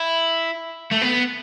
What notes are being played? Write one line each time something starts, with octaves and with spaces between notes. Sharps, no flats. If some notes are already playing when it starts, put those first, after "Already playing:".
Already playing: E4
A3
B3